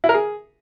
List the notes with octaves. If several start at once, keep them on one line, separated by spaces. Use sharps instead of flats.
E4
A#4
G#4